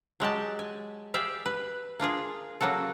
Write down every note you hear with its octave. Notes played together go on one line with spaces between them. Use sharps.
F#3 G#3 G4 A5
G#5
G4 G#4 D5 E5 F5
B4
A#3 D4 F4 G#4
C#3 F#3 A#3 F#4 A4